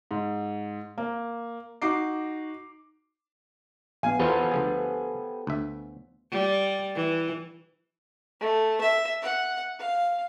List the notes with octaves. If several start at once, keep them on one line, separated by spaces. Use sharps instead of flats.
G#2
A#3
D#4 F#4 D6 C7
A#1 B3 F5 G#5
E2 E3 F4 G4 A4 B4 C5
D2 F3 G#4
D2 E5
G3
E3
A3
E5
F#5
F5